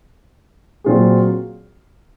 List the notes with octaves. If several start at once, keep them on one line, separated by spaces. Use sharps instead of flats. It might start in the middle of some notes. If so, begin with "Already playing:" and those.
A#2 F#3 C4 F4 G#4